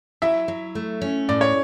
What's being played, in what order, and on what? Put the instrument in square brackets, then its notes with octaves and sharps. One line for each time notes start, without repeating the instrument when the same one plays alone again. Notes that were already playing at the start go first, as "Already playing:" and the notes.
[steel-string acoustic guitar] F#3 [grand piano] E4 E5
[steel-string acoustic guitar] F#3
A3
C#4
[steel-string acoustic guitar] A2 [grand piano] D5
[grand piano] C#5